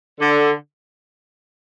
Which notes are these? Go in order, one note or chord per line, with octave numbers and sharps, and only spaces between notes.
D3